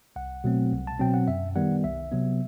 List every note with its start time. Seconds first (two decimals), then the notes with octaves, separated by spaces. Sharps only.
0.16 C2 F#5
0.44 B2 F#3 A3 C4
0.72 C2
0.87 A5
0.99 B2 F#3 C4 G5
1.14 F#5
1.28 F#2 E5
1.56 D#3 G3 B3 F#5
1.84 C2 E5
2.12 C3 F#3 B3